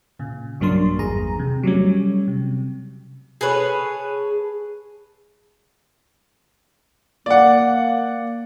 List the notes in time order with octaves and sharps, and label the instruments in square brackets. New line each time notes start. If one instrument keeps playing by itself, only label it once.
[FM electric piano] A#2 C#3
B1 G2 F#3 A#3 D4 C6
G#1 E2 G#4 A#5
C3
F#3 G3 A3 C#4
C3
[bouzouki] G#4 A4 B4 C#5
[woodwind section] A#3 [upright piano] D5 F#5